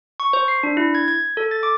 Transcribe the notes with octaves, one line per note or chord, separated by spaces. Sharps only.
C#6
C5
C7
D4
E4
G#6
G#6
A4
A6
D6